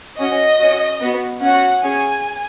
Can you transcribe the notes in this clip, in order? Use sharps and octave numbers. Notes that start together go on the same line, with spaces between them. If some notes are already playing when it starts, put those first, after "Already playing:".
C#4 F#4 D#5
C#4 F#4
B3 F#4
C#4 F#4 F#5
C#4 G#4 G#5